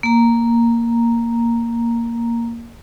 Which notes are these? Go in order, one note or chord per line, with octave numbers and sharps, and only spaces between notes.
A#3 A#5